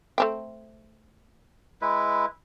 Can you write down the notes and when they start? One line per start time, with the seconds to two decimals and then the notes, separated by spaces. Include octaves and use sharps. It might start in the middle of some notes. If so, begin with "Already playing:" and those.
0.18 A3 C4 G5
1.82 G#3 E4 B4